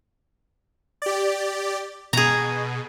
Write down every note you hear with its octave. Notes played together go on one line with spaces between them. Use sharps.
G4 D5
B2 G#4 A#5